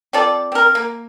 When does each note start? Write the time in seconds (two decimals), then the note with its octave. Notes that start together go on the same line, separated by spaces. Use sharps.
0.13 C4 F4 A4 D5
0.52 C4 A#4
0.75 A#3